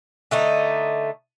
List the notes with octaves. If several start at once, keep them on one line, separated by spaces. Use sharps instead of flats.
D3 A3 D#4